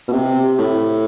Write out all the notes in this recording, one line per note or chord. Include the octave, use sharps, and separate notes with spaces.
B2
C3
A2